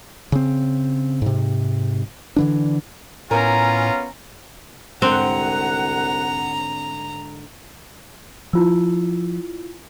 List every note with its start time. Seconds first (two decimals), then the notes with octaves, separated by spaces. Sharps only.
0.32 C#3 C4
1.22 G#2 C3
2.36 D3 E3 D4
3.31 A2 B3 C#4 F4 A#4 G#5 A#5
5.02 C2 G#2 D3 C4 G4 F#5 A#5
8.53 F3 E4 F4 E6